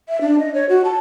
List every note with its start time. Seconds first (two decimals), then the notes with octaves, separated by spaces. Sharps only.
0.09 E5
0.21 D4
0.39 D#5
0.54 C#5
0.69 F#4
0.85 A5